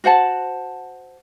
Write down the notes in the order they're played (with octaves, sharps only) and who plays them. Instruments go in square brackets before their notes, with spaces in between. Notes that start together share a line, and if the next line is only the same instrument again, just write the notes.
[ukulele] F#4 C5 F#5 A5